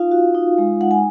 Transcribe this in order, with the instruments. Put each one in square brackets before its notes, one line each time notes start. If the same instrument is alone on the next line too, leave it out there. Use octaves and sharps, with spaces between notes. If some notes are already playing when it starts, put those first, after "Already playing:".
Already playing: [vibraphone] D#4 F4 F5
F#4
D#4
G#3
D#4 F#5
G#5